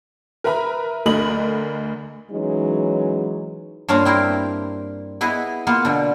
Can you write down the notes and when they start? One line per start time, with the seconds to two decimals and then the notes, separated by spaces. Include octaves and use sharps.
0.44 A#4 B4 E5 A#5 B5
1.06 D2 D3 A#4 D#5 B5 F#7
2.32 E3 F#3 G#3 C#4 D#4
3.88 G2 A#3 C#4 D4 F4 A#5
4.05 C4 E4 G4 A#4 F5
5.21 B3 E4 G#4 B4 D#5
5.67 A#3 B3 F4
5.85 B2 D3